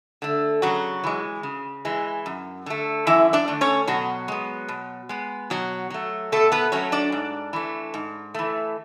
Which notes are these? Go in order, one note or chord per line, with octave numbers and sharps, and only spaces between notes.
D3 A3
C#3 F#3 F#4
E3 G#3
C#3
E3 G#3
F#2
D3 A3
F#2 E3 E4
D4 D5
D3 A3
C#4 C#5
B2 F#3 F#4
G#3 B3
B2
G#3 B3
B2 F#3 F#4
F#3 A3
B2 A3 A4
B3 B4
F#3 A3 C#4 C#5
D4 D5
G#2
E3 A3
G#2
E3 A3